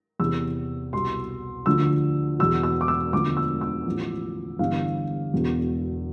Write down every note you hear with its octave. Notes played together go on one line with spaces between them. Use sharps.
E2 C3 E3 E6
C2 B2 C6
D2 D3 F3 E6
E2 B2 E6
E6
D6
E6
E1 D2 D3 F3 D6
E6
E6
A1 A2 F3
G1 G2 E3 F5
E1 E2 B2